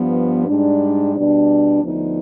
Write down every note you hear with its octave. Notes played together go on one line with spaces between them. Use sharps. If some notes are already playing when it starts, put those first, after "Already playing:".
Already playing: G2 F3 B3
G#2 G3 D4
B2 G3 D4
D2 D3 F3 B3 D#4